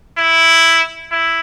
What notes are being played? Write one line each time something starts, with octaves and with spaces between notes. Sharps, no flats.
E4
E4